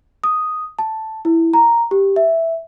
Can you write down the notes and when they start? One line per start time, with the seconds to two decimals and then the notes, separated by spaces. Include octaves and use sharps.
0.24 D#6
0.79 A5
1.25 E4
1.54 A#5
1.91 G4
2.16 E5